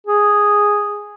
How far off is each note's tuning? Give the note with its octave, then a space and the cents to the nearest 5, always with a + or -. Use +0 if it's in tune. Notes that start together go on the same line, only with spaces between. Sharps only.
G#4 -5